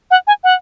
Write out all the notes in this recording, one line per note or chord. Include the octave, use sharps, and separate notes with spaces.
F#5
G#5
F#5